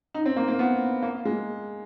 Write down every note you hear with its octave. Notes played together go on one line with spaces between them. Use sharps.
D#4
C4
A#3
A#3
B3
A#3
G#3